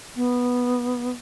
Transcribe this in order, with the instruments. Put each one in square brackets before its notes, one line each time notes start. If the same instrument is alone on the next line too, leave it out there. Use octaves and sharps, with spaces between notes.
[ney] B3